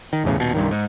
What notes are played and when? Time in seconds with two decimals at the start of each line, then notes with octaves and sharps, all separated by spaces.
0.13 D#3
0.24 B1 E2 A2 C#3
0.36 D#1 B2
0.55 C2 G2 D#3
0.71 G#2